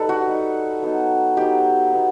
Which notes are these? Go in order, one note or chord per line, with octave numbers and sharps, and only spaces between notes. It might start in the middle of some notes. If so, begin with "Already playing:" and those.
Already playing: G3 D#4 A4 B4
F#4
G3 D#4
F#3 B3 D#4
F#3 B3 D#4 G4
F#3 B3 D#4